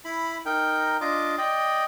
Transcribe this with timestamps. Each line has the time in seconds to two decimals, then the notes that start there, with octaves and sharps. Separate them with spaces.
0.05 E4 B5
0.46 D#4 A#4 G5
1.01 D4 F4 D#5 D6
1.38 D5 D#5 G5